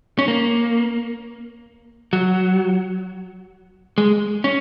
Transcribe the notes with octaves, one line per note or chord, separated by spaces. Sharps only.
C#4
A#3
F#3
G#3
C#4